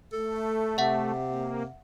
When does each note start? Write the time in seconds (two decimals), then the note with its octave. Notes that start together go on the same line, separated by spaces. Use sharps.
0.13 A3 A4
0.78 C3 E5 F#5
1.30 A#3